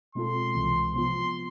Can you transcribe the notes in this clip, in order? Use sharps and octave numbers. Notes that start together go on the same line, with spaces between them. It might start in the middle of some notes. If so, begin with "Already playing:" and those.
B2 G#3 C4 F4 A4 C6
C2 C3 E3 G#3
C3 F3 B3 F4 C6